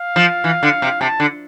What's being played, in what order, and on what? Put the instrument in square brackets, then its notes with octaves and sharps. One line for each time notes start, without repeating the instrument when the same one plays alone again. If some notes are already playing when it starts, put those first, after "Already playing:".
Already playing: [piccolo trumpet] F5
[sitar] F3
E3
D3
C3
[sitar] C3 [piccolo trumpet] A5
[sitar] D3